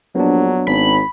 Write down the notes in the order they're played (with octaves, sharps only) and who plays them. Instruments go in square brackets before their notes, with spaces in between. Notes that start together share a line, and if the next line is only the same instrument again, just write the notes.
[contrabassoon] A#1 [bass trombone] F#3 [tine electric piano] B3 D4
[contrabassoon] G#1 [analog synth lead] B5